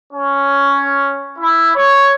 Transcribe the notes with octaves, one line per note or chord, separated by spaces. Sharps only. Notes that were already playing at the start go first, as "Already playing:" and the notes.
C#4
E4
C#5